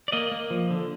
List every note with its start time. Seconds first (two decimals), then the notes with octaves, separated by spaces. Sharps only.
0.08 D5
0.12 A#3 D#5
0.31 A#3
0.50 F3
0.71 D3